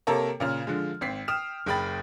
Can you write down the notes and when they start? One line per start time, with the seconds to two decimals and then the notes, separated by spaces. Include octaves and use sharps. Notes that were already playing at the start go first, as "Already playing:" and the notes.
0.07 C3 A#3 A4 A#4 C#5 A#5
0.40 A#2 C#3 F6
0.67 D3 F3 G#3
1.01 G#1 C4 B6 C7
1.28 G5 D#6 F6 E7
1.66 F#1 G#4 G5 B5 A6